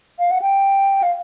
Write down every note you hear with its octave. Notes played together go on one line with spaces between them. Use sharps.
F5
F#5
G5
F5